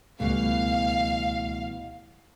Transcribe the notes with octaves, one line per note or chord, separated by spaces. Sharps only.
C#2 B2 E3 G3 A3 F5